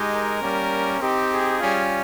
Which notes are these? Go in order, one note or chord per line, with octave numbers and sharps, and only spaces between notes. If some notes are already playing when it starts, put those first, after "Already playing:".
Already playing: G#3 D#4 G4
A#4
G3 A#3 C#4
C4 D#4 G4
G#4
G3 C#4 F4